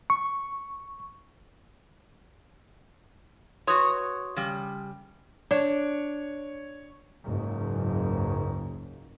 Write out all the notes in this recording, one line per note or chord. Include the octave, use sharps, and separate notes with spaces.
C#6
F#4 B4 C#5 C6 D#6
C#3 G3
D4 C#5
F#1 C#2 G#2